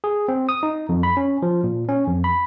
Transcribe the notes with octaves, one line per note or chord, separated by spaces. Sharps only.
G#4
C4
D#6
D#4
F2
B5
C#4
F3
A#2
C#4
F2
B5